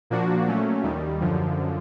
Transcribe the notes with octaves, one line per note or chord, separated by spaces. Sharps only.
A#2 F3 A#3 D4 F#4
A#2 F#3 A3 C#4
D#2 D#3 G3
F#2 D3 F3